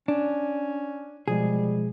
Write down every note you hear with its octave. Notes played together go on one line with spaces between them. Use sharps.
C#4 D4
B2 F3 G3 G#3 G#4